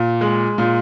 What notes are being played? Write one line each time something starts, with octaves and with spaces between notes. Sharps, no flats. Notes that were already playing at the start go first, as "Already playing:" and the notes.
Already playing: A#2
G#3
A#2